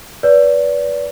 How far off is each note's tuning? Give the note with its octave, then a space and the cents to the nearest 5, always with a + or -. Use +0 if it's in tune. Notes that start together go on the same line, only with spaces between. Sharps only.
B4 -15 D5 -30